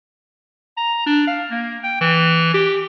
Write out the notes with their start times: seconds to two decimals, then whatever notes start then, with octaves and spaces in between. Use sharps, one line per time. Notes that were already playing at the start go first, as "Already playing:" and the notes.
0.77 A#5
1.06 D4
1.27 F5
1.51 A#3
1.84 G5
2.01 E3
2.54 G4